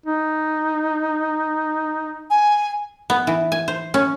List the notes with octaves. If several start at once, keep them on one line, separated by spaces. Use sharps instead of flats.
D#4
G#5
B3
E3
G#5
C5
C#4